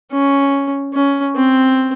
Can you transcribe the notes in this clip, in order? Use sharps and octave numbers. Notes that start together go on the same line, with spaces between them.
C#4
C#4
C4